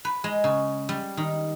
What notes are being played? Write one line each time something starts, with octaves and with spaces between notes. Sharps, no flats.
B4
G#3
C#3
G3
D#3